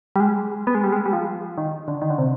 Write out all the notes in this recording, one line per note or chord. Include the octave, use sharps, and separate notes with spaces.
G3
G#3
B3
G#3
G3
G#3
G3
F3
D#3
D3
D#3
D3
C3